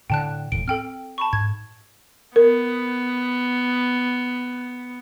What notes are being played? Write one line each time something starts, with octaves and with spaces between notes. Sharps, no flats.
A2 D3 G5 A5 F#6
E1 D#2 A2 D7
C4 A4 G5 F6
A5 B5 C#6
G#2 G#6
B3 A#4